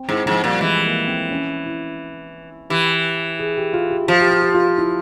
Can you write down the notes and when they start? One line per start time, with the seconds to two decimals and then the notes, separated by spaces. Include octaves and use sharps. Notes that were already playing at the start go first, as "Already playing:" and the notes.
Already playing: C4
0.09 G#2 E4
0.26 G#2 F3
0.44 A#2 G3
0.61 E3 G#3
0.85 A#3
1.07 C4
1.31 C#4
1.66 E4
2.70 E3 G4
3.39 G#4
3.57 G4
3.73 F4
3.91 G4
4.08 F3 F4
4.20 G4
4.31 F4
4.42 G4
4.54 F4
4.78 E4